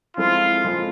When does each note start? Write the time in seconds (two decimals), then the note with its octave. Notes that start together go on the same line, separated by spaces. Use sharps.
0.17 F3 G#3 C4 E4 F4 A4
0.64 F3 G#3 C4 E4 A4